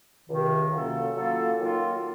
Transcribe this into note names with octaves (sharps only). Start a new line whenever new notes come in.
C#2 C3 D#3
C#3 F#3 A#3 F4 A4
C#3 F#3 A#3 F4 A4
D#3 F#3 A#3 F4